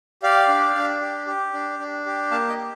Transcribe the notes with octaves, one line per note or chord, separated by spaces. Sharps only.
G4 D5 F5
D4
D4
G4
G4
D4
D4
G4
A#3 F5 A5
D#5 G5
G4